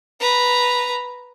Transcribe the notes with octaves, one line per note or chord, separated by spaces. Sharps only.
B4 A#5